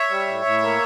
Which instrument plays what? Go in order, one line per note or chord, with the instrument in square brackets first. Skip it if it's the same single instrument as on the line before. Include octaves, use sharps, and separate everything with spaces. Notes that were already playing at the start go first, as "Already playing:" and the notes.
Already playing: [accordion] C#5 E5
G3
A2
A2
A#3